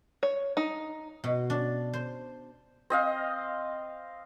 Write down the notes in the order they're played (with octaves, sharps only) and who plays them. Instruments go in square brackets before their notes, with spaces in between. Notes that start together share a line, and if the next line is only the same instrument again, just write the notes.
[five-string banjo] C#5
D#4
[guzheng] B2
D4
C5
[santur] C4 D#5 F5